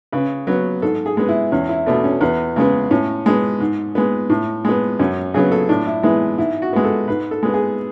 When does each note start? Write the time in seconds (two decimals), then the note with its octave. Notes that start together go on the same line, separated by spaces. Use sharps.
0.12 C#3 B4
0.47 F#3 B3
0.82 G#2 A4
1.06 G#4
1.17 G#3 B3
1.29 E4
1.52 E2 C#4
1.69 E4
1.86 B2 A3 D4
2.04 C#4
2.21 E2 B3
2.56 C#3 G#3 B3
2.91 A2 C#4
3.26 G#3 B3
3.60 G#2
3.95 G#3 B3
4.30 A2
4.65 G#3 B3
4.99 F#2 C#4
5.34 C#3 F#3 B3 G#4
5.52 A4
5.69 A2 D4
5.87 E4
6.03 E3 G#3 B3
6.38 G#2 E4
6.62 F#4
6.73 G#3 B3
6.84 A4
7.08 G#2 B4
7.31 A4
7.43 G#3 B3
7.54 G#4